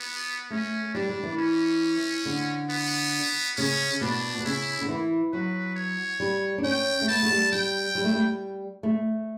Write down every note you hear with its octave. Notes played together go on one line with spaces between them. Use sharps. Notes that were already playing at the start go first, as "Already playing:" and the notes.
Already playing: B3
A3 C#4
G3 D4
G3
E3
C#4
D3
B3
C#3 C#4
B2 D4
B2
C#3 E4
D3
E3
F#3 B4
C#5
G3
D4
C#4 G5
A3
B3 A5
A3
G3
G3 G5
G3
A3
G3
A3